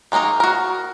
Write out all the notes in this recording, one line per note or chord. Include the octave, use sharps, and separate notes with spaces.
D#3 G#3 A#3 D#4 A#5
F#4 A#4